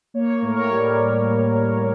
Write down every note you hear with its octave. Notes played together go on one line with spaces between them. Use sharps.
A#3 C#5
A2 A#4
C#5
G3